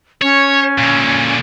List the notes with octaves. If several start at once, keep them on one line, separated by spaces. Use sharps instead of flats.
C#4 C#5
A#2 D3